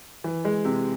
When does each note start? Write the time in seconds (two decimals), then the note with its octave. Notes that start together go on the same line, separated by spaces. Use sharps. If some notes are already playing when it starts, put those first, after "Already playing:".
0.24 E3
0.45 G#3
0.65 C3